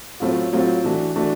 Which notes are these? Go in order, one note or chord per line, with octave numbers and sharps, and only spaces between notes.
A2 F#3 A3 C4 F4
A2 F#3 A3 C4 F4
E3 A3 D4 F#4
E3 A3 D4 F#4